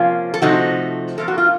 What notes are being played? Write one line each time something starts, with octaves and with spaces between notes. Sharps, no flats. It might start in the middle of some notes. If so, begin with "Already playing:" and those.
Already playing: C3 F3 A#3 C#4 F4
A4
C3 F3 A3 D#4 F#4
C3 F3 A#3 A4
F#4
F4